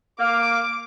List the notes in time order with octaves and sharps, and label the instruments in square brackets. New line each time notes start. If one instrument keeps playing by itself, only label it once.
[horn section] A#3 F5 [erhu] D6